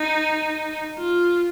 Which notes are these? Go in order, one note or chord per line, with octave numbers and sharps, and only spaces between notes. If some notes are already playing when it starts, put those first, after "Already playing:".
Already playing: D#4
F4